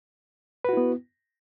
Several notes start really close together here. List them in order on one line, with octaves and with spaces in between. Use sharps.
B4 F#4 E4 B3